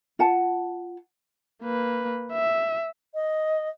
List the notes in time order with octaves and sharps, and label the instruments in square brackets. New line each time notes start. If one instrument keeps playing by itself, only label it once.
[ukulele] F4 F#5 A5
[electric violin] A#3 B4
E5
[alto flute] D#5